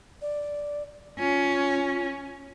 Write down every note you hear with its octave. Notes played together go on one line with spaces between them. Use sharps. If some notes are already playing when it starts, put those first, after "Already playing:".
D5
C#4 F4